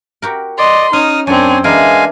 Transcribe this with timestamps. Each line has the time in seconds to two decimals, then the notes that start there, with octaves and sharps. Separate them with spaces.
0.22 F#4 G4 A#4
0.58 D5 D#5 C6
0.93 C#4 D#4 D#6 F6
1.27 F#2 C4 D4 C#5 G#5
1.64 E3 G#3 D4 A#4 F5 G#5